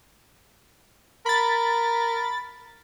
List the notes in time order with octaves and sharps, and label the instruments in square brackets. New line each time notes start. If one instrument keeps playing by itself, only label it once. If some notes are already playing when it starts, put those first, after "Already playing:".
[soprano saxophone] A#4 [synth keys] B5 A6